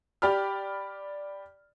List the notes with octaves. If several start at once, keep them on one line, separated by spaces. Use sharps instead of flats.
G4 D5 B5 F6